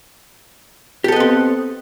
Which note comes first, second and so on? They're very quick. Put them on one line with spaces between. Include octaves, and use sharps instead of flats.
G4 A4 D#5 B3 C4